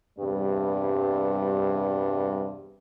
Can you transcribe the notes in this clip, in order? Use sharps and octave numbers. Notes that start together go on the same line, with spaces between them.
E2 G2 C3 G3